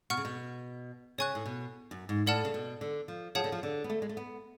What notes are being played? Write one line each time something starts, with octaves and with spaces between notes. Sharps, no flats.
B2 F#5 C#6 F6
C#3
B2
C#3 C#5 G#5 C#6 F#6
A2
B2
F#2
G#2
A2 A4 D5 F#5 A5 F6
C#3
B2
D3
F3
F3 G#4 C#5 F#5 A5
D3
F3
D3
B3
A3
G#3
A3
B3